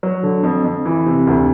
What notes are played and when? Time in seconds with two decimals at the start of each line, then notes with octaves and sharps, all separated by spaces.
0.03 F#3
0.23 D3
0.43 F2
0.64 F2
0.85 E3
1.06 C3
1.27 D2